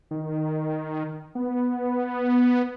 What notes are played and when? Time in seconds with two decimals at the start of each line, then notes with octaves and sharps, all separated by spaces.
0.11 D#3
1.35 B3